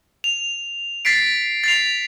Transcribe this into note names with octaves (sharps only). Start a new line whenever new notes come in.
F7
A6 B6 C7 D7
A6 C7 F7